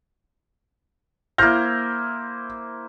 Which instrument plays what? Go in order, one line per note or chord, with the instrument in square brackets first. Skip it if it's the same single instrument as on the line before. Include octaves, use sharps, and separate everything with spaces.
[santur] A#3 E4 C5 [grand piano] F6 G6 A#6